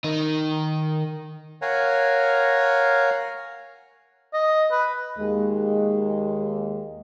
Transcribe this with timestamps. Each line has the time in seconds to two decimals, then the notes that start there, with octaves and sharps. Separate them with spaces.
0.04 D#3 D#4
1.62 A#4 C#5 F5 F#5 G#5 A#5
4.34 D#5
4.71 B4
5.18 D#2 G#3